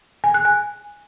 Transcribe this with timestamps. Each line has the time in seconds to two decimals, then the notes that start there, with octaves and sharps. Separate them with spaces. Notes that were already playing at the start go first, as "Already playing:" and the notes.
0.24 G#5
0.34 F#6
0.45 G#5